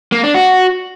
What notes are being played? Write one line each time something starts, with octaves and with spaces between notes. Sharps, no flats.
A#3
D4
F#4